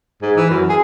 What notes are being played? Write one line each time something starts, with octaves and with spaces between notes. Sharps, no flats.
G#2
E3
F#2
G#4